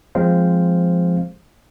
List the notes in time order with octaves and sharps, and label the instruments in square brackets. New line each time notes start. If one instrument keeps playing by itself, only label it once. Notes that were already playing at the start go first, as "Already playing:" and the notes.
[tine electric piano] F3 G#3 C4 C5 F5